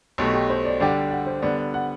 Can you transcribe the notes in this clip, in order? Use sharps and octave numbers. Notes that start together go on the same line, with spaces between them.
B1 B2 A3 G4
G4
C5
D5
D3 G3 D4 G4 F#5
F#5
C5
D3 G3 B3 D5
D5
F#5